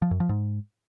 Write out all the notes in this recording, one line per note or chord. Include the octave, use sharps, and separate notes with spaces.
F3
F#2
F3
G#2